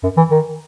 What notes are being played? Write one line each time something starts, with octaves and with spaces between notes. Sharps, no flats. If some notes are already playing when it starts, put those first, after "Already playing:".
F#2
E3
D#3